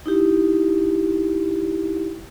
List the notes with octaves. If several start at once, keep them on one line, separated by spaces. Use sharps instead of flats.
D#4 E4 G4